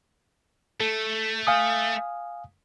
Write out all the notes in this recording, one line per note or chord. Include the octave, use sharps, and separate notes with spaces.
A3 A4
F5 G#5 D#6